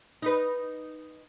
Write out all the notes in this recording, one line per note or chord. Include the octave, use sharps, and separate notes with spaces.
D#4 B4